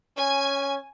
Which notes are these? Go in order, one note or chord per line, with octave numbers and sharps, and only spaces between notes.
C#4 G#5